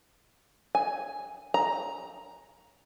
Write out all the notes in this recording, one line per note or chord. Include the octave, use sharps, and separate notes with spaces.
G#5
A#5